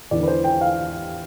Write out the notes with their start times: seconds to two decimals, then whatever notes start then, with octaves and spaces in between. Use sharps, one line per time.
0.11 E2 D3 D5
0.23 B4
0.28 C5
0.44 G5
0.61 F5